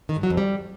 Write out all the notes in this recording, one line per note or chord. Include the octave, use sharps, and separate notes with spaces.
D#3
G2
F#3
F2
G3